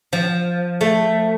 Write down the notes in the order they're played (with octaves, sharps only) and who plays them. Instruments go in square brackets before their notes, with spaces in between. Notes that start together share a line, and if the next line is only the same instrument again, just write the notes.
[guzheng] F3
A3